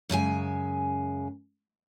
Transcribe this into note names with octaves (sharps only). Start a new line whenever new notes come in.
F#2 C#3 G#3 G#5